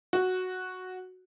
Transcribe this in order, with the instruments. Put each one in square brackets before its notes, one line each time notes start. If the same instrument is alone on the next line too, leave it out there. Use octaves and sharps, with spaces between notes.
[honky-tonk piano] F#4